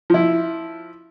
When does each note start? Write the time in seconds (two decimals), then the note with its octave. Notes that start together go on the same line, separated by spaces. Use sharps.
0.10 F3 E4